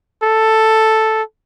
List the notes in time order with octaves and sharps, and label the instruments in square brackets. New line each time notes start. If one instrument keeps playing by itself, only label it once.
[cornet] A4